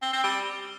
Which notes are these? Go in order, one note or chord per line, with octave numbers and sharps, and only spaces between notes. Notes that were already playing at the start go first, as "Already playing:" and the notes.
C4
C4
G3